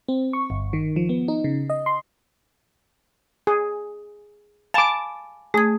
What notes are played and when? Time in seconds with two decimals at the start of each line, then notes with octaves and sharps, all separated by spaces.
0.08 C4
0.33 C#6
0.50 G1
0.73 D#3
0.96 F3
1.09 B3
1.28 D#4
1.44 C#3
1.70 D#5
1.86 C6
3.47 G#4
4.74 F5 G#5 A5 B5 D6
5.54 A3 G#4 G#6